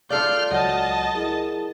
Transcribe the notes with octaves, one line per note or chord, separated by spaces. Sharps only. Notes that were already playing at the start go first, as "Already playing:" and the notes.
F4 A4 D5 F5 F6 G6 C7
C#2 F#3 D#5 F#5 A5
E4 G#4 A#4